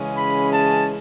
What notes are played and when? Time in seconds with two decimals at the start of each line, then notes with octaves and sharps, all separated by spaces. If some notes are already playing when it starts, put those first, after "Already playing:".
Already playing: C#3 E3 G#3 C#4
0.16 B5
0.52 A5